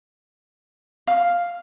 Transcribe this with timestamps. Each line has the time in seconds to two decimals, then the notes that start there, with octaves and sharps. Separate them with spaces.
1.07 F5